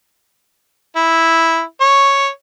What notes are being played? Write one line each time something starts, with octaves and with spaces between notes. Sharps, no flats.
E4
C#5